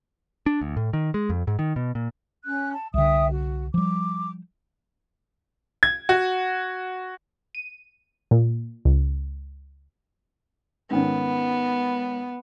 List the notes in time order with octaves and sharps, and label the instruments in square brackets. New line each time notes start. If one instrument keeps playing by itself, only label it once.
[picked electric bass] D4
D2
A2
D#3
G#3
F2
G#2
D#3
B2
A#2
[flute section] C#4 F#6
A5
[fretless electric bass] C2 D3 [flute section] E5 G5 D#6
[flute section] F#4
[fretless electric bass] F3 G3 [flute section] D6
[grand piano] G#6
F#4
[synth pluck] D#7
A#2
C#2
[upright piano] G#2 D#3 C#4 [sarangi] B3